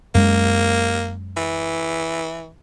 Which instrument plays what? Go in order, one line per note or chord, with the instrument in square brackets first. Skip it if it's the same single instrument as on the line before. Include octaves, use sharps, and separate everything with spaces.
[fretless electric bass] F#2 G#3 [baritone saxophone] A#3
[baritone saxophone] E3